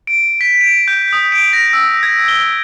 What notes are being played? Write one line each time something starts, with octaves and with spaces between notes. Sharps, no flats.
D7
B6
D7
G6
D#6
D7
A#6
E6
G#6
G7